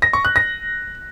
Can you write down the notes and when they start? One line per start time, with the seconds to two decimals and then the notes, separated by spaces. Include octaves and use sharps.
0.02 A#6
0.13 C#6
0.25 F#6
0.36 A#6